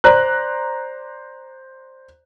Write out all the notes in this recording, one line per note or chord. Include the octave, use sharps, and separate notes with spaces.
C5 D5 A#5 F#6